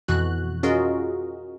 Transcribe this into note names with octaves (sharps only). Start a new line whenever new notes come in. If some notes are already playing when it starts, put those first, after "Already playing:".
F2 B2 E3 F#4 F#6
C#4 F4 F#4 G#4 A#4 D#5